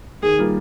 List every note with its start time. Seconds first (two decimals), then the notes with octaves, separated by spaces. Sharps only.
0.22 D#3 G#4
0.38 G3 A#3 F4 A#4